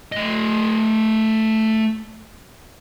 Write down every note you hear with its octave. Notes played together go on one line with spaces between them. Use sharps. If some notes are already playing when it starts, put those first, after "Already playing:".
A3 D#5